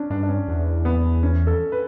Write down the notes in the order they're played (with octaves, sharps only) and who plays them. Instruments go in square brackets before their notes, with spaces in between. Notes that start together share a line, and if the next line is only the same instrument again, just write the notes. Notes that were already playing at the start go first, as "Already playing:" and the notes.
Already playing: [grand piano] C#4 D4
[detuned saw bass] G2 [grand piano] D4
[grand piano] D4
C#4
[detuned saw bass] E2
[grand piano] B3
C#4
A4
B4